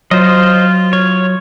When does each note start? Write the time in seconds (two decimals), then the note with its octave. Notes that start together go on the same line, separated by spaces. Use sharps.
0.11 F#3 F4 C5 D#5
0.93 C#5